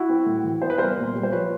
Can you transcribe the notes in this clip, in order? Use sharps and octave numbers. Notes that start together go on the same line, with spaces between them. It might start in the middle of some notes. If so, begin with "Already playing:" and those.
Already playing: E4 F#4
C4
A2
E3
B3 C5
B4
C2 A#4 C5
A#2
G3
C5
F3 B4 C#5